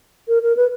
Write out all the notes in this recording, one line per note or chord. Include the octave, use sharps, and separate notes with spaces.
A#4
A#4
B4